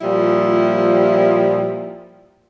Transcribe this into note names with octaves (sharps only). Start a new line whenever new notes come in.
A#2 F3 G3 E4